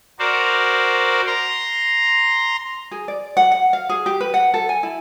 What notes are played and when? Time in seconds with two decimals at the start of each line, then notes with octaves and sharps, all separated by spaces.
0.19 F#4 A#4 C5 D5
1.27 A#5 C6
2.91 G#4
3.08 D5
3.37 F#5
3.52 F#5
3.73 F5
3.89 G#4
4.06 G4
4.21 B4
4.34 F#5
4.54 A4
4.69 G#5
4.83 E4